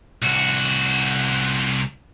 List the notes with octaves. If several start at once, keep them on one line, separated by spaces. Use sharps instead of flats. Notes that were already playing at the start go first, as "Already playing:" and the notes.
C2 F#4